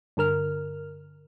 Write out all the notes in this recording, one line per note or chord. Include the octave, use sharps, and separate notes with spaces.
G2 D3 A#4 F6